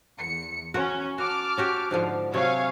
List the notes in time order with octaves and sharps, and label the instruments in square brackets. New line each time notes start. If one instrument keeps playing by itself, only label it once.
[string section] E2 C#7
[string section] C#4 [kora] F#4 A#4 F#5
[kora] F#4 [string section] A5 D6 F6
[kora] C#4 F#4 G4
G#2 D3 F3
[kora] C3 F#3 [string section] C#5 F5 G#5